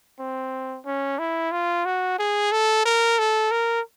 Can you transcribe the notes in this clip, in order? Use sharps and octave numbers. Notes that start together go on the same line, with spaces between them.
C4
C#4
E4
F4
F#4
G#4
A4
A#4
A4
A#4